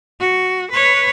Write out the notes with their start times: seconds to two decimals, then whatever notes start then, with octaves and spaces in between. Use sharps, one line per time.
0.20 F#4
0.71 B4 C#5